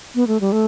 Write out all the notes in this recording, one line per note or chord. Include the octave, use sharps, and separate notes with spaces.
B3
A3
G3
A3